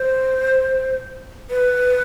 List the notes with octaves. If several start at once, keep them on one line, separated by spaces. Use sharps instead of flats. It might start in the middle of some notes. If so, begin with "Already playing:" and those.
Already playing: C5
B4